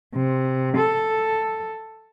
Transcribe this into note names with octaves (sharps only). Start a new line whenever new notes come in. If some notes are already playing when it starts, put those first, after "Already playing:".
C3
A4